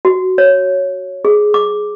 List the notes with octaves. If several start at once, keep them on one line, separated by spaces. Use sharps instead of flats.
F#4
C#5
G#4
D6